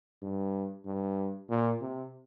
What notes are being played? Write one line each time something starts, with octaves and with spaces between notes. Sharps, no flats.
G2
G2
A#2
C3